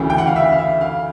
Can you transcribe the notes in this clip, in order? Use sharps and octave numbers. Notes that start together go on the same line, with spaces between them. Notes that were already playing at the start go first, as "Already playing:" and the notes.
Already playing: D2 C#3 E3
G5
F#5
F5
E5
F5
E5
F5